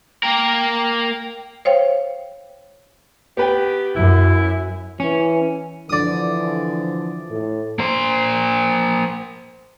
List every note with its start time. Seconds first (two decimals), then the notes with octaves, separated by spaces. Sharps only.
0.23 A#3 A#4 G5
1.65 C5 C#5 F5 G5
3.37 B3 G4 B4 G5
3.96 F#2 E4
5.00 E3 C#4
5.89 D3 E3 F3 D5 D#6
7.29 A2
7.79 A#3 C5